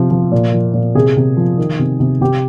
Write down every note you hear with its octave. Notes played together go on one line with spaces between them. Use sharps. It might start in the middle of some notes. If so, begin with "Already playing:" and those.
Already playing: C3 F3
F3
A#2
F3
A#2
C3 G#4
C3
F3
D#3
C3
C3
C3 G4